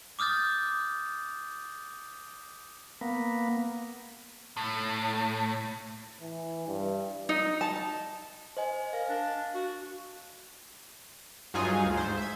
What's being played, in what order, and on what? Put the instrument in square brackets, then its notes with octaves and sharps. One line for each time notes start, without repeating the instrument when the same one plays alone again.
[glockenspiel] D6 D#6 F6 G6 A6
[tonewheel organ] A#3 B3
[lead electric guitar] A2
[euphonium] E3
G2
[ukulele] D#4
A5
[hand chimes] C5 D#5 G#5
[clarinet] A#4 [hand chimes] F5
[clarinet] D4
F#4
[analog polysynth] G2 F#3 D#4 F4 G#4 G#5
D2
G#2 C5
E5 G#6